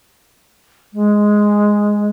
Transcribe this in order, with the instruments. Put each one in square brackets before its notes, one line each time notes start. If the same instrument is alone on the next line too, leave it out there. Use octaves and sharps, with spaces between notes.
[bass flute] G#3